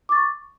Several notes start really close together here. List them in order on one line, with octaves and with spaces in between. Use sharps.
D6 A6 C#6